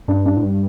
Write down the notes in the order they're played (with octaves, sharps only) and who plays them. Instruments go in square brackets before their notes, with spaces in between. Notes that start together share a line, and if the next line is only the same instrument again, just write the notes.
[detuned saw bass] G2 [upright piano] D4
[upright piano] D4
[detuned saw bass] A2
G2